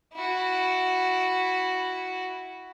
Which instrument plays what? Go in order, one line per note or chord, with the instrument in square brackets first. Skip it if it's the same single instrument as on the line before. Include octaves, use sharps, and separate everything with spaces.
[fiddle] E4 F#4